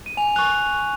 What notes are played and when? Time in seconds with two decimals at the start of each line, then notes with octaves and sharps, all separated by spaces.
0.06 D#7
0.17 G#5 F7
0.36 C#6 F#6 F7